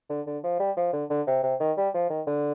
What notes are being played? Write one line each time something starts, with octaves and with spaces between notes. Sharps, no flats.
D3
D3
F3
G3
F3
D3
D3
C3
C3
D#3
G3
F3
D#3
D3